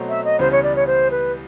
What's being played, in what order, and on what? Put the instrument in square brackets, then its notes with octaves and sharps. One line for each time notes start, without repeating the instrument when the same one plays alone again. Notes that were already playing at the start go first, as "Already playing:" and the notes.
Already playing: [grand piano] B2 F#3 A3 C4
[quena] E5
D#5
[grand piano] C#2 C#3 E3 G3 B3 [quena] C5
[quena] C#5
D5
C#5
C5
B4